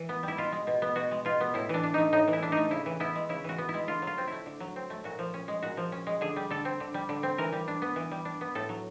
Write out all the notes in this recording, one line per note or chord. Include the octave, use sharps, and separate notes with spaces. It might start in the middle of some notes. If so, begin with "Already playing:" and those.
Already playing: E3
B3
G3 E4
B2 F4
G#3
B2
B3
B2 F#4
G#3
B2 F4
B3
A2 E4
E3 D4
D4
A3 D#4
A2 D#4
E3
E4
D4
D#4
A3
C#3 E4
E3
B3 E4
G#3
C#3 E4
E3 F#4
B3
E4
G#3
D3 F4
F#3 F4
C4
A3 E4
D3
F#3
C4
A3
A#2 F#4
F3
C#4
G#3
A#2 F#4
F3
C#4
G#3
D3 G#4
G3
D3 A4
C4
D3
G3
D3
C4
E3 A#4
G3
D4
B3
E3
G3
D4
B3
A2 A4
F#3